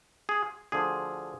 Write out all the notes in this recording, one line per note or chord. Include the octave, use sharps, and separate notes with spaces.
G#4
D2 D3 F3 G#4